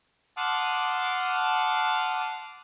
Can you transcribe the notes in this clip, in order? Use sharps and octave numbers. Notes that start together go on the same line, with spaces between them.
F#5 A5 C6 D6 D#6 F6